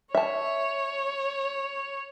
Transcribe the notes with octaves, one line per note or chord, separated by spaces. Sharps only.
C#5 E5 A5